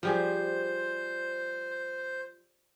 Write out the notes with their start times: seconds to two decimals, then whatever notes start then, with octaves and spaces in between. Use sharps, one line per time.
0.03 F3 G3 G#4 C5